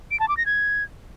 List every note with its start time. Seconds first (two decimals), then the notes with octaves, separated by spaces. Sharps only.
0.11 D7
0.20 A5
0.28 D6
0.37 A#6
0.46 G#6